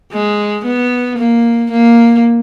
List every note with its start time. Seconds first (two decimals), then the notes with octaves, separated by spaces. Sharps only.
0.12 G#3
0.65 B3
1.19 A#3
1.71 A#3